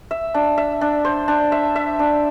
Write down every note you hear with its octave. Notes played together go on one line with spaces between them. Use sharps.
E5
D4
E5
D4
C5
D4
E5
E5
D4